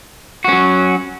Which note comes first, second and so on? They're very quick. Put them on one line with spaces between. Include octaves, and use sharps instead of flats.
F#4 C#4 F#3